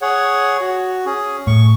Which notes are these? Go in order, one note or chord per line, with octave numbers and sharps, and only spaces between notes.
G#4 C#5 F#5
F#4
C#4 G#4
A2 C#6